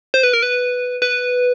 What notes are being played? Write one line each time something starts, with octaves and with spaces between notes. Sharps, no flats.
C5
B4
A#4
B4
B4